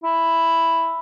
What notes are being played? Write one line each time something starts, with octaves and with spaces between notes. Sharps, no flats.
E4